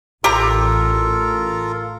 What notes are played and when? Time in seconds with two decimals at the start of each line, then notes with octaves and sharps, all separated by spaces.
0.24 A1 F4 G4 A4 A#4 A#5